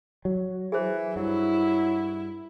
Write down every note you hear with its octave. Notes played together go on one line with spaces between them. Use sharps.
F#3
E3 G#4 C5
G2 F#3 E4